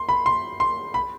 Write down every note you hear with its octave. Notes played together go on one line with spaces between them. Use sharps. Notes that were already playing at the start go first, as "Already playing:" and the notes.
Already playing: C6
B5
C6
C6
B5